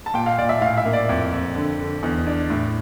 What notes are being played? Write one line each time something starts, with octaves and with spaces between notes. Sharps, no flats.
A5
A#2 G5
F5
A#2 D5
E5
A2 F5
E5
A#3
D5
F2
F2
D3
D3
E2
D4
A2